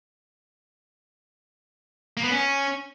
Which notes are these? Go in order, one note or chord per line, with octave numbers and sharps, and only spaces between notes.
A#3
B3
C#4